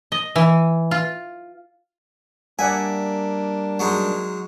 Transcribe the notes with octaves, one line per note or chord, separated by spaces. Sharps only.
D#5
E3
F4
G3 A#3 D4 D5 E5 F#5 G#5
F#3 G#3 D#4